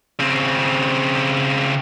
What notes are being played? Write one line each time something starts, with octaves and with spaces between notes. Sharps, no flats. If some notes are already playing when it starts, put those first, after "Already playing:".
C#3 C4